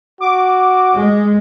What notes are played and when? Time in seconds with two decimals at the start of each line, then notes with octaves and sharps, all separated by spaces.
0.20 F#4 D6
0.96 G#3